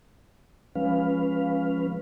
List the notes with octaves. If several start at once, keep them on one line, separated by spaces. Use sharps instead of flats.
F3 G#3 C#4 B4 F5